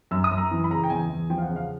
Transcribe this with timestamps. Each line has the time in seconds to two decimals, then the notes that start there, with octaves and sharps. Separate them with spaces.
0.11 F#2 E6
0.24 D#6
0.31 F#2
0.38 A#5
0.51 E3
0.64 B5
0.70 C#3 A#5
0.84 G5
0.90 E2 G#5
1.10 E2
1.30 F3 G5
1.38 F5
1.43 F#5
1.49 C#3
1.56 F5